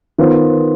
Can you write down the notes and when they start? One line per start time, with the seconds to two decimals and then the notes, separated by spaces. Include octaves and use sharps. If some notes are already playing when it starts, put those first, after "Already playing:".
0.18 D#3 B3 F4 C5